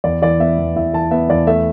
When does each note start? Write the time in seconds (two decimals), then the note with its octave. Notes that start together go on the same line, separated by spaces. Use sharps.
0.04 E2 D5
0.22 E3 D5
0.40 B3 E5
0.58 E2
0.76 E2 E5
0.93 E3 A5
1.11 B3 E5
1.30 E2 D5
1.47 A3 E5